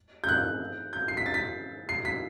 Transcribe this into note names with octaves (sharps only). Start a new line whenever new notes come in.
G6
F#6
G6
C7
B6
A6
B6
C7
B6